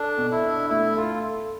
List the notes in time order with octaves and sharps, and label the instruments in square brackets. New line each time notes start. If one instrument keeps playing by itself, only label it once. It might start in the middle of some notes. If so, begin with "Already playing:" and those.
Already playing: [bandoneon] D4 [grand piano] A4
[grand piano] B2
[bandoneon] E4
[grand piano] D4
[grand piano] A3 [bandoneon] E4
[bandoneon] F4 [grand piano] A4